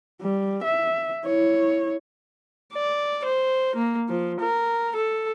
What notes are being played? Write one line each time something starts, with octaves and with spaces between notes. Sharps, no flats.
G3
E5
E4 C#5
D5
C5
A#3
F3
A#4
A4